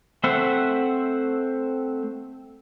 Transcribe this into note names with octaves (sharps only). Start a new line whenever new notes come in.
A3 C4 C5 E5 F#5